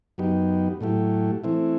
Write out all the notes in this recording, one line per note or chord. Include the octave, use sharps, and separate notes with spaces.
F#2 F#3 B3 D#4 G4
A2 F#3 A3 E4 G4
E3 A3 C4 E4